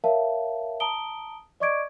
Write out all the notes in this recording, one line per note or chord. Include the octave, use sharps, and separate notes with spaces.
A#4 C#5 E5 F5 A5
A5 A#5 D#6 D7 G7
D5 D#5 C#6 D6 G#6 D7